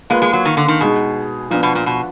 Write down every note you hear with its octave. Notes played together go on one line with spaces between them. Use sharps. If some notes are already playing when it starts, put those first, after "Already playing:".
G#3 A#3 F4 B4
G#3
F#3
D#3
D3
D#3
B2 G#3 D#4 G#4
A#2 F3 B3 D4
B2
A#2
B2